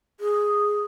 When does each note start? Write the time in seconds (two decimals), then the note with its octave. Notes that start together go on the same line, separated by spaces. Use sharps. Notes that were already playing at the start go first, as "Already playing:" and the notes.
0.20 G#4